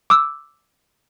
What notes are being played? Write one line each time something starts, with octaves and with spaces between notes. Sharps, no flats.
D6 E6